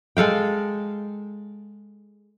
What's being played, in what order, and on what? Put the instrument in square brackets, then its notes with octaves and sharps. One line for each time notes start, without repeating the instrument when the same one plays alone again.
[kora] G#3 A4 F5 G5